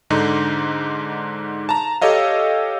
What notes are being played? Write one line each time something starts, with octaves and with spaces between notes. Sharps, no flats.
G#2 D3 D#4
A5 A#5
G4 A4 C#5 D#5 F5